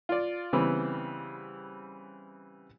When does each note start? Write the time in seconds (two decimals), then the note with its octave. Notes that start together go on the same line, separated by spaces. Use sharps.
0.09 F4 D5
0.53 C#3 E3 G3 B3 C4